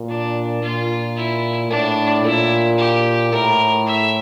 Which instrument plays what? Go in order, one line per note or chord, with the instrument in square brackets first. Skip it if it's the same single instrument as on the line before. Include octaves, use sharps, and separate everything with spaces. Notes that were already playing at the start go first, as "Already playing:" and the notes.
Already playing: [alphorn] A#2
[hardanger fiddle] D4
[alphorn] A#2 [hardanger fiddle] F4
[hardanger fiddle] E4
[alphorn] A2 [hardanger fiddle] D4
[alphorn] A#2 [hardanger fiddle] E4
[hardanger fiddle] G4
[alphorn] A2 [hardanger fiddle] A#4
[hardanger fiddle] E5